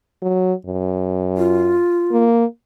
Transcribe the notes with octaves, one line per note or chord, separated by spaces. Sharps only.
F#3
F#2
F4
A#3